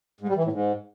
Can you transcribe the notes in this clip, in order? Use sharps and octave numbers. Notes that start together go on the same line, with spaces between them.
G#2
G3
E3
A2
G#2